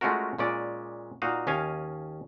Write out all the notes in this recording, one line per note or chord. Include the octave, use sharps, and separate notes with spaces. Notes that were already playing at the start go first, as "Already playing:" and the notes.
G#3 A3 C#4 F4 F#4 A#4
A#2 G#3 C#4 D5
A#2 D#4 F#4 D#5 F5
D#2 C#4 D#5 F5 G#5